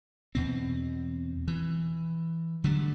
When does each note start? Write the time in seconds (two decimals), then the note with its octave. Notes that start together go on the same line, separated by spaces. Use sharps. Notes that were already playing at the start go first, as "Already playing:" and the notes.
0.35 E2 B2 C4
1.48 E3
2.64 D3 F#3 G3 A3